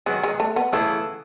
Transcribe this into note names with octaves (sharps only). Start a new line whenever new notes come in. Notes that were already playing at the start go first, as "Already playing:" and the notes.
D#3 F#3 G#3 B3
G#3
A3
B3
C#3 E3 A3 B3 E4